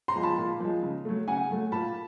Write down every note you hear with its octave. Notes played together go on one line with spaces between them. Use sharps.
A#5 C6
F3 G#3
A5 B5
A#2
F3 G#3
C#3
F#3 A3
C#3 F#5 G#5
F#3 A3
A#2 A5 B5